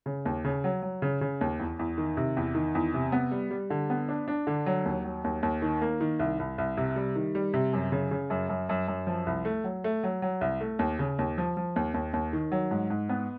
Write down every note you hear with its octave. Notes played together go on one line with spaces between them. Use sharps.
C#3
D#2
C#3
F#3
F#3
C#3
C#3
D#2
E2
E2
D#3
C3
E2
D#3
E2
C3
B3
G3
G3
D3
B3
D4
D4
D3
F#3
D#2
F#3
D#2
D#2
D#3
A#3
D#3
C2
C2
C2
C3
G3
D#3
G3
C3
F#2
C#3
C#3
F#2
F#2
F#2
F#2
F3
C2
A3
F#3
A3
F#3
F#3
C2
A3
D#2
C#3
D#2
F3
F3
D#2
D#2
D#2
D#3
F#3
G#2
G#2
B3